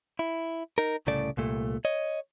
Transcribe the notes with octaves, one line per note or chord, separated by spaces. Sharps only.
E4
D#4 A#4
C2 A2 C#3 A3 D5
C2 A#2 A3
C#5 D#5